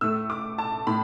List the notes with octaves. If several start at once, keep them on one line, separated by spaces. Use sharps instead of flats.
A2 A3 E6
D6
A5
A2 B5